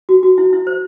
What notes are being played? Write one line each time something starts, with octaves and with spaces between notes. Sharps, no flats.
F#4
F#4
E4
E4
C5